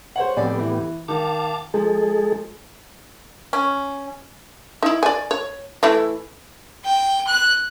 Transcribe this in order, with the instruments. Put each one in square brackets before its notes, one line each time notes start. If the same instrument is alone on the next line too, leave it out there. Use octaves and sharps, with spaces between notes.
[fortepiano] C5 C#5 F#5
[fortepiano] F2 D5 G#5 [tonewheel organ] A2 B3 G4
[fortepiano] E3
[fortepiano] D#3 [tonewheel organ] F5 A5 D6
[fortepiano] F3 [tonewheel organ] G#3 G#4 A4
[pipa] C#4
[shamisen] D#4 E4
D5 G#5
C#5
E3 A3 E4
[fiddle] G5
F#6